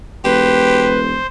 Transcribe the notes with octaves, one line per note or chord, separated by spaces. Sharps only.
E1 G4 B4 C5